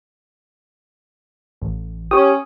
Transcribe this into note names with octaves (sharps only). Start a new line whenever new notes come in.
A1
C#4 G4 C#5 D#6